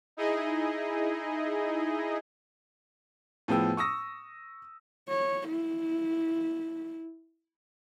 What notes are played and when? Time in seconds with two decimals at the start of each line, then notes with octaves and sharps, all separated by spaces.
0.17 D#4 E4 G#4 D#5
3.48 A2 F3 B3 G#4 G5 E6
3.77 C#6 D#6 E6 A#6
5.09 C#5
5.48 E4